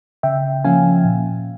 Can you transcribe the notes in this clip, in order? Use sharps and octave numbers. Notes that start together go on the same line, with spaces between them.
C#3 E5 G5
F3 A#3 C#4 F5 G#5
A#2